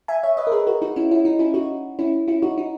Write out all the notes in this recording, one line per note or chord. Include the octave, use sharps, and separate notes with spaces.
E5 G#5
C#5 E5
B4 D#5
A#4
G#4 B4
F#4 A#4
D#4 F#4
C#4 E4
C#4 E4
D#4
C#4 E4
D#4 F#4
C#4 E4
C#4 E4
D#4 F#4
D#4